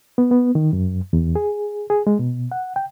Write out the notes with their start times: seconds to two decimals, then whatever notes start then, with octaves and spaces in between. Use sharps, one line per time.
0.18 B3
0.31 B3
0.55 D#3
0.73 F#2
1.13 E2
1.36 G#4
1.90 G#4
2.07 G#3
2.19 B2
2.52 F#5
2.76 G5